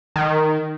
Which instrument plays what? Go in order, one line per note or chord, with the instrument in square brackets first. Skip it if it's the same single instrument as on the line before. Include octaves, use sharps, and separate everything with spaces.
[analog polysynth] D#3